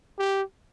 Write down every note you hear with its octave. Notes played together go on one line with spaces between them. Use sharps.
G4